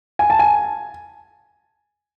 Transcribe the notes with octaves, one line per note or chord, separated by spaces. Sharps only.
G#5
A5
G#5